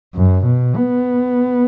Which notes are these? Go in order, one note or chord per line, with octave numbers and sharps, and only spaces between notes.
F#2
B2
B3